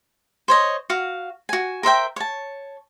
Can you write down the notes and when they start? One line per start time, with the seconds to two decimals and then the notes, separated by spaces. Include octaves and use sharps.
0.48 C5 C#5 D#5
0.90 F#4 F5
1.49 F#4 G#5
1.83 A#4 C5 E5 G5
2.16 C#5 A5